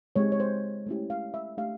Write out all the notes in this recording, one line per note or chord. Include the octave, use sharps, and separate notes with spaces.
G#3 C4 D#4 G4 C#5
C#5
C5
A3 C#4 E4 G4
F5
E5
A3 D4 G4 F5